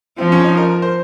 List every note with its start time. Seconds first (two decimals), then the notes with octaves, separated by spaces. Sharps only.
0.18 F3 C4
0.32 C#4
0.44 D#4
0.57 A#4
0.70 A#4
0.82 C5